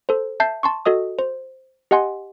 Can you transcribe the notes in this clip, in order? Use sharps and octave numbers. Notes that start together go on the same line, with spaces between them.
A4 C5
E5 A5 G6 C7
A5 C6 C#6
F#4 A4 D#5 D#6
C5
G4 D#5 F#5 G#5 C6